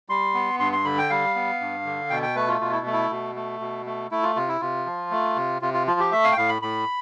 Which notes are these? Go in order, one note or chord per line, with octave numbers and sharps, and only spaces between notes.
G3 C6
B3
G2 C6
C6
D3 B5
G5
G3 F5
B3
G2
D3
B2 G5
G5
A3 B4
F4
B2 F4
E4
A3
E4
B2
A3
B2
A3
A3 E4
F4
C3 F4
E4
C3 F4
F3
A3
C3
C3 F4
F4
F3 F4
G4
A3 E5
F5
G5
A2 F5
B5
A2 B5